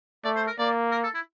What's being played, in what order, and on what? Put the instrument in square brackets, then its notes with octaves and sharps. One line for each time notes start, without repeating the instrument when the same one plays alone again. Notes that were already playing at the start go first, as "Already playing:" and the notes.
[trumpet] A3 [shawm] D5
[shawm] C5
A#4
[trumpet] A#3 [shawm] D5
[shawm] A#4
A4
E4